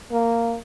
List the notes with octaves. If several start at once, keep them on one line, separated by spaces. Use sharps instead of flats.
A#3